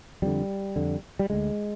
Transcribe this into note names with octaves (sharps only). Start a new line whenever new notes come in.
F2 D3 G3
F2 D3
G3
D2 D3 G#3